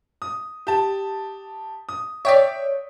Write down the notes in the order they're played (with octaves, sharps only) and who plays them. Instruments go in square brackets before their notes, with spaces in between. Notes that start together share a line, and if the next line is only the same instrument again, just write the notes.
[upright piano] D#6
G4 A5
D#6
[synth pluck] C#5 D5 [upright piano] E5 G5 B6